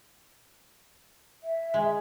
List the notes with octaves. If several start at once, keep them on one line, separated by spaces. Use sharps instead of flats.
E5
G#3